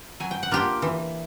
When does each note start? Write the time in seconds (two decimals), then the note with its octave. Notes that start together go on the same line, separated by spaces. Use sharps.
0.20 F#3 G#5
0.31 G5
0.43 F#5
0.51 A#3 D4 F4 G4 G5
0.82 E3